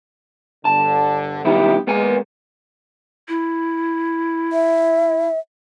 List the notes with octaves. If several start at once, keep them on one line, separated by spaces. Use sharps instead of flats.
G1 D3 A5
B1 D#3 G3 B3 E4 G4
G#3 A#3 B3 G#5
E4
E5